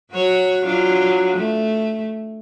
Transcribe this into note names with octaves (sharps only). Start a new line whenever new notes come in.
F#3 F#4 C#5
F#3 D4 F4
A3